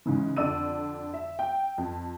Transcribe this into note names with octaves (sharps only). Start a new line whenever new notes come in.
G#2 C#3 E3
F2 D3 D5 E6 D#7
E5
G5
F2